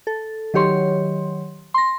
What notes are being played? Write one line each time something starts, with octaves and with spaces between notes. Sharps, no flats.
A4
D#3 F#3 G4 C#5 C6
C6 A#6